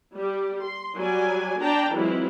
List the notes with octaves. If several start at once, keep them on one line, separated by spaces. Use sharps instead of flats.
G3 G4
C6
F#3 G3 D5 G#5
D4 D5 G5 A5 A#5
E3 F#3 G#3 C4 E4 F4